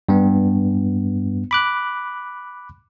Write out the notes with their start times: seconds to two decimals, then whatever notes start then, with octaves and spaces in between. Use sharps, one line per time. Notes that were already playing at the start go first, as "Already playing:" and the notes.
0.09 G2 B3
1.51 B5 D6 F#6